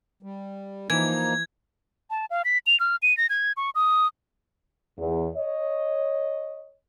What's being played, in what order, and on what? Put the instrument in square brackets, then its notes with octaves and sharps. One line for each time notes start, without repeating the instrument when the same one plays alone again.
[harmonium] G3
[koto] E3 [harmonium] F3 A#3 D#4 [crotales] G#6
[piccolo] A5
F5
B6
F7
F6
D#7
A#6
G#6
C#6
D#6
[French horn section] E2
C#5 D#5